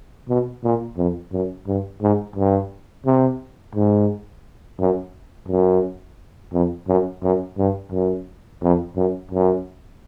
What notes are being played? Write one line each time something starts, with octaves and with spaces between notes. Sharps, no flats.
B2
A#2
F2
F#2
G2
G#2
G2
C3
G#2
F#2
F#2
F2
F#2
F#2
G2
F#2
F2
F#2
F#2